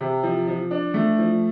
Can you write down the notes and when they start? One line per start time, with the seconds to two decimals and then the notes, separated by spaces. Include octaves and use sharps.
0.01 C3
0.23 F3
0.48 F3
0.71 D4
0.94 A3
1.18 F3